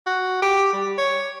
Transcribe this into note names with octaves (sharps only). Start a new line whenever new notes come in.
F#4
G4
G3
C#5